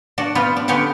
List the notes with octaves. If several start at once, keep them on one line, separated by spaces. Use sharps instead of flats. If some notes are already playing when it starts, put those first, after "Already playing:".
D4 F#4
G3 B3 C4 F4
D4
D3 B3 C#4 G4 F5 F#5